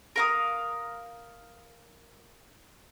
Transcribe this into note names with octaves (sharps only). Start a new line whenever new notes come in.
A#4 F5 D#6